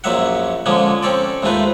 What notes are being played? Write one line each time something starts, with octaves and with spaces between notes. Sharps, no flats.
A#1 F#2 A#2 F#3 E5 F#5
D3 F3 G#3 A#3 C#4
C4 C#4 A4 D5
D#2 G#2 A3 F4 B4